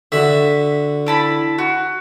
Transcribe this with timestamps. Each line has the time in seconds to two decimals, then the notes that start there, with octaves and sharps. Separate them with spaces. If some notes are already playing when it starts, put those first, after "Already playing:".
0.12 D3 F#4 E5
1.06 E4 A5 B5
1.58 F#4